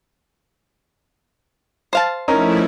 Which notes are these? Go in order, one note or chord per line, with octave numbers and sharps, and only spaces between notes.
C5 F5 A5
F3 A3 C#4 D#4 E4 A#4